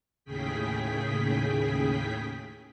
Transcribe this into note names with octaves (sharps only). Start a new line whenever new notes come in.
D#2 A2 C#3 G#4 G5 B6